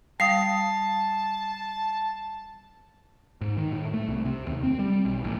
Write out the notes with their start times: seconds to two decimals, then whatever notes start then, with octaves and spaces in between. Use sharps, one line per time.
0.20 G3 F5 A5 D#6 C7
3.41 G#2
3.57 D#3
3.72 A2
3.94 A3
4.08 C2
4.25 C3
4.46 D#2
4.63 C4
4.79 G3
5.05 B1
5.24 A1